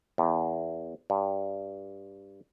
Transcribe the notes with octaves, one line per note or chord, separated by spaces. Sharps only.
E2
G2